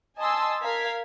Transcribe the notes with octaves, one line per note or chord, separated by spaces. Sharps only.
D#5 G#5 A5 C6 D#6 E6
A#4 F5 G#6 B6